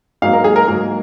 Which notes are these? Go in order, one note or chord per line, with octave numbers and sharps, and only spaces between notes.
G#2 F#3 A#3 F5
A#4
G#4
A#4
G#2 F#3 A#3